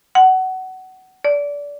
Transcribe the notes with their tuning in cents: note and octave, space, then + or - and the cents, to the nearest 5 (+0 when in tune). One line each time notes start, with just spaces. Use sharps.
F#5 +20
D5 -25